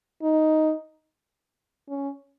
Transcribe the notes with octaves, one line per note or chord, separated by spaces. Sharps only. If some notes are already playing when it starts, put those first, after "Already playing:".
D#4
C#4